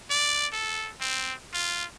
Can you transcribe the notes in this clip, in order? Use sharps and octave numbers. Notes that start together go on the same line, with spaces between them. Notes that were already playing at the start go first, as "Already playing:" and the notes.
D5
A4
C4
F4